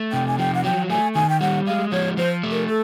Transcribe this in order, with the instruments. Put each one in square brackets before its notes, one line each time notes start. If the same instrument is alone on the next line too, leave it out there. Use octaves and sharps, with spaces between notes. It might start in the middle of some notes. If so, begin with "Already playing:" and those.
Already playing: [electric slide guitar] A3
[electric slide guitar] C3 [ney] G5
[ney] G#5
[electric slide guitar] F3 [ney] G5
[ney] F#5
[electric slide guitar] F#3 [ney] G5
[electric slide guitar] A3 [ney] G#5
[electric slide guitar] D#3 [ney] G#5
[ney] G5
[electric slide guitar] G3 [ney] F#5
[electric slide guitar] G#3 [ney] F5
[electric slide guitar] F3 [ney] C#5
[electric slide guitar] F3 [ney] C5
[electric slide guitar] A3
[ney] A#4
A4